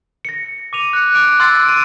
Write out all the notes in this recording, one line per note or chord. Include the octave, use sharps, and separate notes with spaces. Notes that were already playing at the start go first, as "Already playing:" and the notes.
A#6 C#7
D6 D#7 F7
F#6 C#7
D6 F#6 D7 F7
C6 E6 F#6 A6 C7
D7 D#7